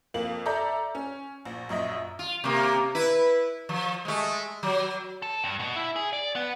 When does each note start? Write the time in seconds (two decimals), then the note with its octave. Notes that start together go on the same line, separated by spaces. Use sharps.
0.14 F2 A#3 F#7
0.46 A4 D5 E5 A#5 G6
0.95 C#4
1.45 A#1
1.69 A#1 F#2 D#5 E5
2.19 F4
2.44 C3 A#3
2.95 E4 B4
3.69 F3
4.05 G#3 A3
4.63 F#3
5.22 A4
5.44 G2
5.59 B2
5.76 E4
5.96 G#4
6.13 D5
6.36 B3